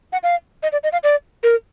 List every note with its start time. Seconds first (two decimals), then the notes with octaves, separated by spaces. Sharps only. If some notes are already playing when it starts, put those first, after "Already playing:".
0.13 F#5
0.23 F5
0.63 D#5
0.72 D5
0.84 D#5
0.93 F5
1.04 D5
1.43 A#4